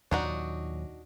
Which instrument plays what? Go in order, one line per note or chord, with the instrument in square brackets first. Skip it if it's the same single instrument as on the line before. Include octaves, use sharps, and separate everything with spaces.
[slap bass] D#2 A#2 F#3 [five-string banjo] D4 D#4 F#4